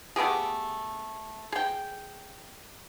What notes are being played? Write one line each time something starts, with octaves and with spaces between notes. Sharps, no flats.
A3 B3 G4 G#4
G#4 G5